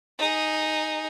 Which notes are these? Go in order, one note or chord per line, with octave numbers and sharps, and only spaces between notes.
D#4 G#4